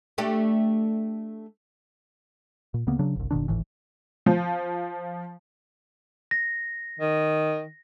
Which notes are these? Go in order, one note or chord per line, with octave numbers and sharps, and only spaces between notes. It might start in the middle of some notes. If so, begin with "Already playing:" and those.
A3 D4 G4
A#2
D2 C#3 A#3 B3
C#3 F#3 D4
G1 C2
F#1 B2 D#3 D4
D1 G#1 A2 E3
F3
A#6
D#3